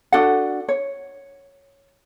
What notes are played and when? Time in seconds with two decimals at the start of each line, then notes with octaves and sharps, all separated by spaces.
0.12 D4 F#4 A4 F#5
0.68 C#5